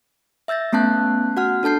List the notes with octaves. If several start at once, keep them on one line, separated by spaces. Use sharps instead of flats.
E5 E6 G6 A6 A#6
A3 B3 C#4 A5 F#6 G6
F#4 F#5 F6
D4 A4 A5 G6 C7